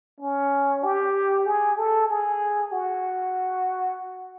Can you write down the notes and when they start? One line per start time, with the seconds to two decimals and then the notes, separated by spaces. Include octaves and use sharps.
0.20 C#4
0.84 G4
1.46 G#4
1.78 A4
2.09 G#4
2.72 F#4